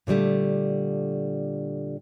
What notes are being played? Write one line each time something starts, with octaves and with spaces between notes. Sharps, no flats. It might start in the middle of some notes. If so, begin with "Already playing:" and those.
A#2 D3 F#3 G3 A3